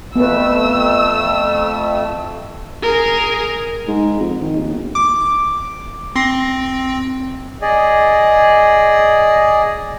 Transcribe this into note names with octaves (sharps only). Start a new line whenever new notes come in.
F2 A3 B3 B4 E6
G#4 A#4
G#2
F2
D#3
D#2
G1
D6
C4 C6 A#6
G#4 D5 D#5